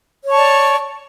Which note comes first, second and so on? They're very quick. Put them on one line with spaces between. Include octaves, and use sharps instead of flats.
C#5 C#6 A5 D5